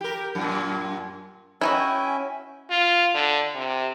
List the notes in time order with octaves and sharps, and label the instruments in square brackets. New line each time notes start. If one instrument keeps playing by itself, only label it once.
[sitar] G4 A#4
F#2 A#2
[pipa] B3 D#4 F#4 [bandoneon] C#4 E5 [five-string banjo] E4 [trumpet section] G5 G#5
[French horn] F4
D3
C3